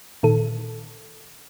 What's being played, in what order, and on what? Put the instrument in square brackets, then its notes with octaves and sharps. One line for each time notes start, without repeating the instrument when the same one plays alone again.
[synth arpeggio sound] A#2 D#3 A4